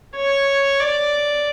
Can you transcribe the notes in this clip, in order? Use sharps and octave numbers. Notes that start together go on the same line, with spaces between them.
C#5
D5